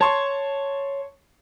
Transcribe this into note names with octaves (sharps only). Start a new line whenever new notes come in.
C#5 A5 C6 C#6